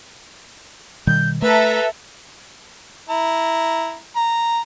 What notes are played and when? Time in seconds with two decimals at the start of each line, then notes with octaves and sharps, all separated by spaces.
1.07 B2 D#3 G3 G6
1.42 A3 A4 B4 E5 A#5
3.10 E4 A#5
4.16 A#5